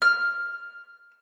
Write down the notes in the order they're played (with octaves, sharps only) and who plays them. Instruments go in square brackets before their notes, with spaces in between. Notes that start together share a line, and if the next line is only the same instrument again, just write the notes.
[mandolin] F6